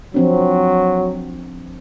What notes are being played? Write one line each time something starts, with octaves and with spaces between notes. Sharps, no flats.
F3 F#3 C4 D4